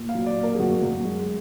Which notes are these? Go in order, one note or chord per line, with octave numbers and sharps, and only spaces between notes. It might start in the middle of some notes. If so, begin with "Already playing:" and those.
Already playing: A#2
F5
F#3
D5
A#2
A#4
G#4
F#2 F#4
F#2
G#3